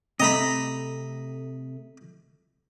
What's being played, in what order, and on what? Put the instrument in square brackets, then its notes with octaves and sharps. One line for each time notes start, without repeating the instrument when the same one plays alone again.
[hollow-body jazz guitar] C3 A3 [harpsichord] D#5 A#5 B5